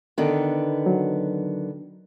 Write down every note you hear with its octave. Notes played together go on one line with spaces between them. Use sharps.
D3 D#3 B3
F#3